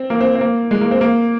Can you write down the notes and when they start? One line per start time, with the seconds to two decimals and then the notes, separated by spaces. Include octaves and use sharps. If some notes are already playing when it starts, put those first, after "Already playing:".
Already playing: C4
0.10 A#3
0.21 C4
0.35 C4
0.41 A#3
0.71 G#3
0.81 A#3
0.91 C4
1.01 A#3